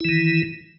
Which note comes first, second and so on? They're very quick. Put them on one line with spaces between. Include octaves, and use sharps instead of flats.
E4 E3 D#3